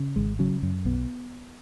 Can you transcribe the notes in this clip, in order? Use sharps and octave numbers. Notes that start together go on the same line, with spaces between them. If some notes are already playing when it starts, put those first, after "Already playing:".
Already playing: C#3
G#1 G#3
C#3 F#3
F#2
B1 B3